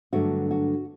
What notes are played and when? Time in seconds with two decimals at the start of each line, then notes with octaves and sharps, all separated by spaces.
0.13 G2 D3 F#3 A3 F#4
0.51 F#4